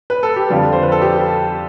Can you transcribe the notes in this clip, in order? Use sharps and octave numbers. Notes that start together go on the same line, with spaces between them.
B4
A4
G4
F2 D3 G3 F4
C5
B4
A4
G4